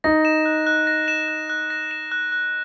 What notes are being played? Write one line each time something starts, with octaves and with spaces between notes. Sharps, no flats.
D#4 A#6
E7
F#6
F#6
A#6
E7
F#6
F#6
A#6
E7
F#6
F#6